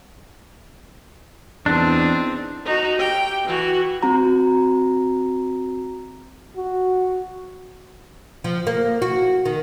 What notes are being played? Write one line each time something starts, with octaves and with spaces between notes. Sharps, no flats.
E2 C4 D4 D#4
D#4 F#4
G4 G5
E3 F#4
C4 F#4 A#5
F#4
F3
A#3
F#4
D#3